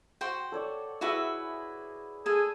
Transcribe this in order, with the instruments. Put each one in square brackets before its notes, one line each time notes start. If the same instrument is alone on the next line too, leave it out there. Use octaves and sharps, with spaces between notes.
[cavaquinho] F#4 C5 G5
[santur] A4 C#5 D5
[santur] E4 G#4 [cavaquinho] F#4 B4 E5
[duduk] G#4 [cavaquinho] A4 G#5